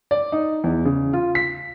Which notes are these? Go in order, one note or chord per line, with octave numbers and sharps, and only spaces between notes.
D5
D#4
E2
C#3
F4
B6